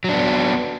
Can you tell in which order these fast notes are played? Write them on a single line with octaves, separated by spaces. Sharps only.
F#3 D4 B3